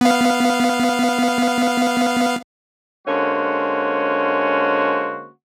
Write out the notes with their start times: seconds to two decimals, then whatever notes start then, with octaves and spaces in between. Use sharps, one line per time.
0.01 B3 F5
3.07 D3 G#3 A#3 C#4 F#4 C5